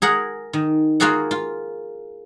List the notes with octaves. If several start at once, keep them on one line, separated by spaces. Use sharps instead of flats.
G#4 A#4 F#5
D#3
A#3 F4 F#4 G#4 F#5
F4